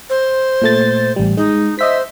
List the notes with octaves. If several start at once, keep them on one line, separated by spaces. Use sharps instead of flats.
C5
A#2 A3 A6
A1 G3
G#3 D#4
C5 D#5 E5 B6